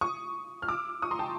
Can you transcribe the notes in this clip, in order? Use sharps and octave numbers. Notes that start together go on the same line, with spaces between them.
C#6 D#6
F6
D6 E6
C#6 D#6
A#5 C6
G5 A5